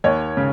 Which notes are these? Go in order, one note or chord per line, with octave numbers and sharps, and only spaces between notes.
D#2 C#5
C#3